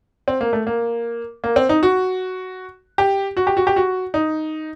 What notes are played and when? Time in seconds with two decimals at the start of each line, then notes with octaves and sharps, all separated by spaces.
0.28 C4
0.41 A#3
0.53 A3
0.67 A#3
1.44 A#3
1.56 C4
1.69 D#4
1.83 F#4
2.98 G4
3.37 F#4
3.47 G4
3.57 F#4
3.67 G4
3.76 F#4
4.14 D#4